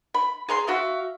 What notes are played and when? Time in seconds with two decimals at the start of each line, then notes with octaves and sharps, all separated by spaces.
0.14 B5
0.49 G#4 A#5 C6
0.67 F#4 E5 F5